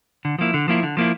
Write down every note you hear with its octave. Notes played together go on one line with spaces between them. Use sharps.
D3
F3 A#3 E4
D3
F3 A#3 E4
D3
F3 A#3 E4